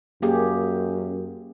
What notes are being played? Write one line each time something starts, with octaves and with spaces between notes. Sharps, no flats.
F#2 A#3 G4 G#4